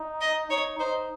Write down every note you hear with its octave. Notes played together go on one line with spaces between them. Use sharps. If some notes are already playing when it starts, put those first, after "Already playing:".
Already playing: D#4
D#5
D#4 C#5
D#4 C5